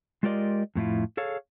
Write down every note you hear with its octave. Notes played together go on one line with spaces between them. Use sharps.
G#3 F4 G4 A#4 D5 D#5
F2 A2 E4 F4
G#4 A4 C#5 F5